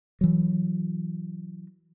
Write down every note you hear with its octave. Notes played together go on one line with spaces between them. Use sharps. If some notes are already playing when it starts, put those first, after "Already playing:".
E3 F#3